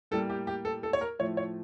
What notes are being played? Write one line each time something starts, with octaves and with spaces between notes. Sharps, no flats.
A2 G3 A#3 A4
G4
G4
A4
A4
C#5
A#4
A2 F3 A3 C#5
C#5